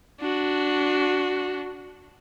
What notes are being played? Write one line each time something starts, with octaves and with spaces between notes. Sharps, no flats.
D4 F#4